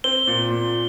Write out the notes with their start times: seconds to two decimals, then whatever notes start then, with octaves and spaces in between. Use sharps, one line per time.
0.04 C4 G7
0.27 A#2
0.51 A#2